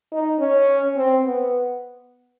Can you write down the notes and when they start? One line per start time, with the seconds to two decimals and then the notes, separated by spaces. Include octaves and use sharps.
0.12 D#4
0.39 C#4
0.96 C4
1.24 B3